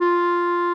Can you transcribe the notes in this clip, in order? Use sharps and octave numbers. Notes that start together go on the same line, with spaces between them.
F4